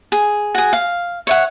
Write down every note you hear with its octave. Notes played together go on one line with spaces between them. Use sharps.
G#4
F#4 G#4
F5
C#5 E5 F#5